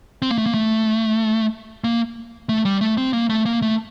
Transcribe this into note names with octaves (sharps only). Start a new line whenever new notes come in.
C4
A#3
A3
A#3
A3
A#3
A3
G3
A3
C4
A#3
A3
A#3
A3